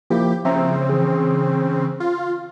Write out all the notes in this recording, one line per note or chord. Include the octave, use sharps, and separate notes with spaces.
F3 A#3 E4 G4
C#3 F3 C4 E5 A#5
E3 G#4
F4